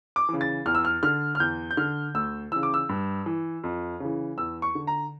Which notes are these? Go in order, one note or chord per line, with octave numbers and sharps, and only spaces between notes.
D6
C#3 E3
A6
E2 F6
E6
F6
D3 F6
F6
E2 G6
G6
D3 F6
D2 E6
C#3 E3 E6
D6
E6
G2
E3
F2
C#3 E3
E2 E6
C#6
D3
A#5